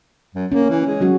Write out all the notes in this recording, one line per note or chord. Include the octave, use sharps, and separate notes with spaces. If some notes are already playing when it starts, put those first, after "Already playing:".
F#2
A#3 C#4
E3
G#3
F#3 C#4 F#4